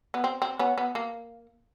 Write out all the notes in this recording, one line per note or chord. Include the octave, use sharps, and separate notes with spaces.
B3
C4
C4
B3 C#4
B3
A#3